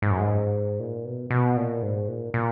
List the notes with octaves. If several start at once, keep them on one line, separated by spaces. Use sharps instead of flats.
G#2
F#2
G#2
A#2
B2
B2
A#2
G#2
A#2
A#2